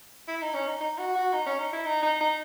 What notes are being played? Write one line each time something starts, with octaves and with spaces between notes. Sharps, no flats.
E4
D#4
C#4
D#4
D#4
F#4
F#4
D#4
C#4
D#4
E4
D#4
D#4
D#4